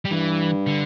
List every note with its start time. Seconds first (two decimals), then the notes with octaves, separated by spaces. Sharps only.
0.05 G3
0.11 G2 E3
0.66 D3